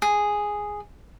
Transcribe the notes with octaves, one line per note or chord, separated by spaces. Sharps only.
G#4